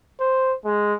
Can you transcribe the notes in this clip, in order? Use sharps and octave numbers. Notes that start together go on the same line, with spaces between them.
C5
G#3